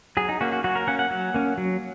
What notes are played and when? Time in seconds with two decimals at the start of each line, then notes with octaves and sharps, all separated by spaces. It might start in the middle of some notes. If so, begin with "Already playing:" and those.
0.17 F#3 G#4
0.29 D#4
0.41 A#3 C#4 F#4
0.52 F#4
0.64 F#3 F#4
0.76 A#4
0.87 A#3 C#4 F#5
0.99 F#5
1.10 F#3
1.34 A#3 C#4
1.58 F#3